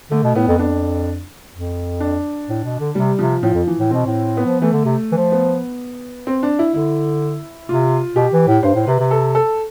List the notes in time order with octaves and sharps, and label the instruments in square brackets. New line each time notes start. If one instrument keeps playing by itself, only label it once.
[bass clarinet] D3 [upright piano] A3
[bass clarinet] B2
[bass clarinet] A2 [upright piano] B3
[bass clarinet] F2
[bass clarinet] F2 [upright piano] D4
[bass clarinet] F2
[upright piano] D4
[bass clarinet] A2
B2
D3
[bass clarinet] C3 [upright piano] G3
[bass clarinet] C3 [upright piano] F3
[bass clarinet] A2 [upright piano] F3
[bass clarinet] F2
[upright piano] E3
[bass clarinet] A2
[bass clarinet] B2 [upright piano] C4
[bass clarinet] A2
[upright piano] B3
[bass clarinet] F3
[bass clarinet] E3 [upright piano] A3
[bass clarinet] D3
C3
E3
F3
[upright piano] B3
C4
D4
E4
[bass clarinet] D3 [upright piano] E4
[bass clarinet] C3 [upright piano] F4
[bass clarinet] B2 [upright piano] G4
[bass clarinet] E3
A2
[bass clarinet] G2 [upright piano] C5
[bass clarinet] A2
[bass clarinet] C3 [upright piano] B4
[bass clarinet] C3
[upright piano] A4
A4